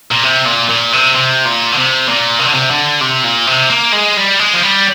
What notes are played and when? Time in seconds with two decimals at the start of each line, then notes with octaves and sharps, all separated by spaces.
0.12 A#2
0.24 C3
0.46 A#2
0.70 A#2
0.93 C3
1.16 C3
1.46 A#2
1.72 D3
1.77 C3
2.08 A#2
2.39 C3
2.46 D3
2.54 C3
2.70 D3
3.01 C3
3.24 A#2
3.47 C3
3.70 A#3
3.93 G#3
4.17 G3
4.39 G#3
4.54 F3
4.63 G3